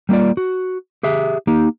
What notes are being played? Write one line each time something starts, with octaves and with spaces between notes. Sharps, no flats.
G3 A#3 E4 F4 D5
F#4
G4 G#4 E5
A#3 D#4 G4